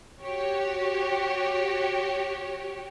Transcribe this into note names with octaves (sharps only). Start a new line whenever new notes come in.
F#4 G4 C#5